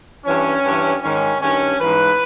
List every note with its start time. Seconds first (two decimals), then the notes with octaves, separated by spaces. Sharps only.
0.25 G2 E3 C#4
0.64 G2 E3
1.03 G#2 D#3 C#4
1.42 G2 D#3 C#4
1.80 G#2 E3 B4